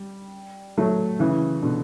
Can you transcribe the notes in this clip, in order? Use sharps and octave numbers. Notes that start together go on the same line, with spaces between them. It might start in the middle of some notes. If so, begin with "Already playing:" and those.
Already playing: G3
F#3 A3
C#3 E3
B2 D3